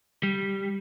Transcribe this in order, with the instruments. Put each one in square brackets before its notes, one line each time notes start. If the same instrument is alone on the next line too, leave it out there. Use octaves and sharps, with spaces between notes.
[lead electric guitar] G3